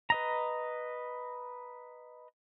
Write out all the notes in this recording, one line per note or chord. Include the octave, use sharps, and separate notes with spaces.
B4 D#5 A#5